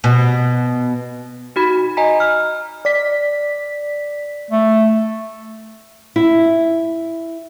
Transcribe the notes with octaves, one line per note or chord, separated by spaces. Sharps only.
B2
D#4 F#4 B5
D#5 G#5 A#5 B6
F6
D5 B6
A3
E4